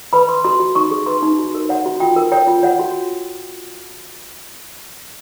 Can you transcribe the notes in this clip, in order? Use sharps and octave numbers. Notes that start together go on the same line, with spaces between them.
B4 B5
B4 C6
F#4 C6
F#4
D#4 C#6
G#4
B4 C6
D#4
F#4
A#4
C#5 F#5
F#4
F4 G5
A#4
C#5 G5
F4
C#5 F#5
F#4